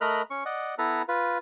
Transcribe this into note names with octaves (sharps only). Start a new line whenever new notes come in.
A3 A#4 D#5 B5 F6 F#6
C#4 C#6
D5 D#5 F#5
B3 E4 A4 B4 A#5
F4 B4